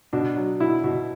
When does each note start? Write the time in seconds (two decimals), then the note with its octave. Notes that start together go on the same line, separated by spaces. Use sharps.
0.13 B2 D4
0.36 F#3
0.60 B2 E4
0.84 B2